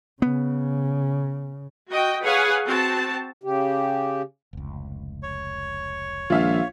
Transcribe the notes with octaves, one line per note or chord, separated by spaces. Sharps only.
C#3 B3
F#4 D#5 G5
G#4 B4 C#5 F5 F#5 G#5
C4 F#4 A5
C#3 G4
F1 C#2
C#5 C#6
A#1 D#3 F3 G#3 F4 E5 F5